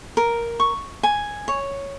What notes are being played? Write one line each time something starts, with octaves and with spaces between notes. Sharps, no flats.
A#4
C#6
G#5
C#5